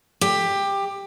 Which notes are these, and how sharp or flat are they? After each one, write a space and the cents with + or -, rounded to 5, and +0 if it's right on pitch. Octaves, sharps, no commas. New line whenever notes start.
G4 +15